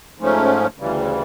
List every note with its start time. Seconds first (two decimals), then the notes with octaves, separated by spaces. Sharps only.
0.18 G#2 F3 A3 C#4
0.78 D2 C#3 E3 G3